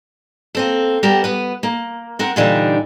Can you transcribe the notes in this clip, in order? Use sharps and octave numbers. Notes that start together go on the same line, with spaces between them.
A#3 C4 A4
G3 B3 G4 A#4 A5
B3 B4
A#3
C4 A#4 F#5
A#2 D3 E3 G3 D4 D#4